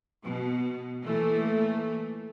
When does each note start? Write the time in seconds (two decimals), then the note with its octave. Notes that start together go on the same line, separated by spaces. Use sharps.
0.24 B2
1.02 A#2 E3 A3